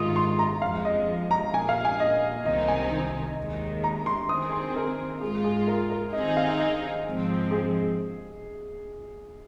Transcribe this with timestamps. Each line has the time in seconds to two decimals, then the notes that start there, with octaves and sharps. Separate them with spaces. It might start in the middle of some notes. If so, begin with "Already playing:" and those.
Already playing: G#2 D#3 G#3 F4 D#6
0.16 C6
0.39 A#5
0.61 F2 F3 G#3 F5
0.85 D#5
1.31 A#5
1.53 A#2 A#3 G#4 G#5
1.69 F5
1.85 G#5
2.00 D#5
2.45 C2 C3 D#3 C4 D#4 D#5
2.68 G#5
3.37 D#2 D#3 G#3
3.84 A#5
4.06 C6
4.29 D#3 C4 G#4 D#6
4.52 C6
4.76 A#4
5.21 G#2 G#3 F4 G#4
5.44 G#4
5.67 A#4
5.90 A#4
6.13 D#3 C4 D#4 G#4 D#5
6.37 F5
6.60 D#5
7.05 G#2 F3 G#3 C4
7.51 G#4